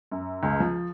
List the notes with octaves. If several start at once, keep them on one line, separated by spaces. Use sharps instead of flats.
F#2
C#2
F3